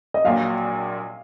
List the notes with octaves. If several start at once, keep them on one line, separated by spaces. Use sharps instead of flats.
D#5
A#1 A#2 F#3 F5